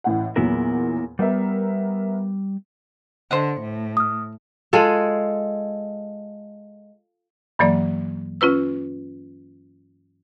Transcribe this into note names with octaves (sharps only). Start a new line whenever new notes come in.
A1 A2 F#5
E2 A#2 F#3 B3 E4 A#4
G3 B3 A#4 E5
D3 C5 D#5 F#5
A2
D#6 F6
G#3 F4 G#4 A4
G2 E3 F#3 A#3 D5
C#4 F4 B4 E6